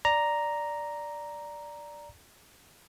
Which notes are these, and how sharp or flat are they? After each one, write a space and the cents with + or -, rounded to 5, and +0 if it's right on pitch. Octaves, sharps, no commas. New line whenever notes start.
D5 +0 A#5 +0